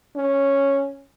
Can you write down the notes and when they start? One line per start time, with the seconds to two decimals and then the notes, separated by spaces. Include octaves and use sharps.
0.15 C#4